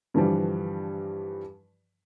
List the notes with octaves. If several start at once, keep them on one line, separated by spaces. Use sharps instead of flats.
G2 D3 E3 F3 G3